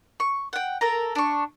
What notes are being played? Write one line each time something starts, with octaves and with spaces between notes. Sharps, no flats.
C#6
F#5 G5
A4 A#4 A#5
D4 C#6